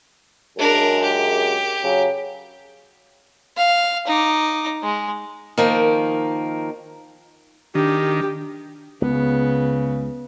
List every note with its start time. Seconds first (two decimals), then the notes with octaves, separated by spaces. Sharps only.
0.58 F#2 C#3 G#3 D4 A#4
1.03 G4
1.84 C#3 F#3
3.57 F5
4.07 D#4 D6
4.83 G#3
5.58 D#3 F3 A#3
7.75 D#3 D4 G4
9.02 C#2 C#3 B3